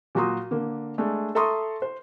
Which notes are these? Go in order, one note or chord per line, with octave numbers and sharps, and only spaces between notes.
A#2 F#3 F#4 A#5 C6 D#6
D3 A#3
G#3 A3 D4
A4 E5 A#5 C6 C#6 D#6
C5